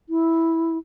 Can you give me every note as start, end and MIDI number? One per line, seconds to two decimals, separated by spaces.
0.09 0.78 64